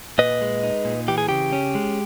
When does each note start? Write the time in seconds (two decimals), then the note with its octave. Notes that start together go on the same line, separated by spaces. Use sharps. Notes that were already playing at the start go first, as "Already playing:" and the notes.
0.18 A#2 B4 D#5
0.41 G#3
0.63 D#4
0.85 A#2
1.08 E3 G4
1.18 G#4
1.29 C#3 G4
1.53 C#4
1.75 G#3